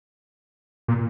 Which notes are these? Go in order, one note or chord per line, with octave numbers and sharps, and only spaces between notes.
A#2